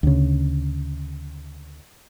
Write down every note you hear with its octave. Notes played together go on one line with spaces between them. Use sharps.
D2 C#3